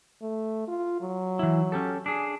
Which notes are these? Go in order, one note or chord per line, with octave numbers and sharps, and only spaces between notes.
A3
F4
F#3
E3 E4
C#4 G4 A4
D4 G#4